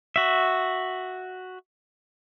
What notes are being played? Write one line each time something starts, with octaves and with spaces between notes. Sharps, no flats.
F#4 E5